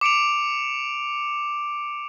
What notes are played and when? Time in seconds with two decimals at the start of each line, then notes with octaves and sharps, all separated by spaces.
0.01 D6 C#7 D7 F7